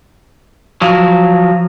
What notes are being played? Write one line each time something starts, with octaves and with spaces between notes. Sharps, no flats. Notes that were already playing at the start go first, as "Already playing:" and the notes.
F3 F#3